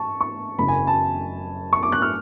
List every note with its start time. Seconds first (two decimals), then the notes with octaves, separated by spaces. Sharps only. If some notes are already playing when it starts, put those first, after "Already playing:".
Already playing: A5 C#6
0.21 C#6
0.58 F#1 F#2 C#3 B5
0.68 G#5
0.87 A5
1.73 C#6
1.83 D6
1.92 F#6
2.02 F6